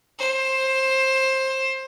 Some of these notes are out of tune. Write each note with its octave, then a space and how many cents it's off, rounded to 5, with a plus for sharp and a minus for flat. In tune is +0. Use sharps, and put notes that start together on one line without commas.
C5 +15